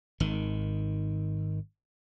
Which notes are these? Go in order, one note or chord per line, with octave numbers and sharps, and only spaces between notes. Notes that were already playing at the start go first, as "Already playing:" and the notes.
G#1 D#3